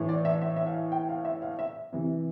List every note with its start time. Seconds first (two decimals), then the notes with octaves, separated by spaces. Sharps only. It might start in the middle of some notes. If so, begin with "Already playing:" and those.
Already playing: A2 E3
0.09 D5
0.25 E5
0.42 E5
0.56 E5
0.67 F5
0.92 G5
1.09 F5
1.25 E5
1.42 F5
1.59 E5
1.93 C3 E3